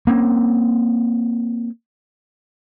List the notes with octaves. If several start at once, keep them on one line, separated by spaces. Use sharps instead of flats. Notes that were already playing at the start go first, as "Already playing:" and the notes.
A#3 C4 C#4